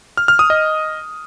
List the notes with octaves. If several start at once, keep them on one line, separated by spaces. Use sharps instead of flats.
F6
F6
D#6
D#5